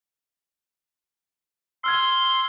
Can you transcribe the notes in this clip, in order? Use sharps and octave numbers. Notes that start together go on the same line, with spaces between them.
C6 E6 F6 G#6